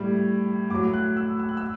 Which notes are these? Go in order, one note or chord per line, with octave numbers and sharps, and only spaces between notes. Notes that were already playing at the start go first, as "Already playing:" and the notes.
Already playing: A2 G3
A2 F#3 D6
F#6
E6
E6
F#6
E6